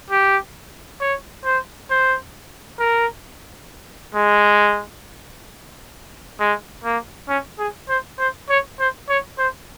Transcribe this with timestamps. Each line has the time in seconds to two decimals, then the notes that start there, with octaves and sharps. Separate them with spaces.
0.10 G4
1.00 C#5
1.45 C5
1.90 C5
2.80 A#4
4.15 G#3
6.40 G#3
6.84 A#3
7.29 C#4
7.59 G#4
7.89 C5
8.19 C5
8.49 C#5
8.79 C5
9.09 C#5
9.39 C5